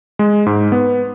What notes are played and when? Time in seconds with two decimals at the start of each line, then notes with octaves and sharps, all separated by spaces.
0.19 G#3
0.46 G#2
0.72 B3